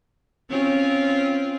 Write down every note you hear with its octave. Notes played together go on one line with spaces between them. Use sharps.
C4 C#4 F4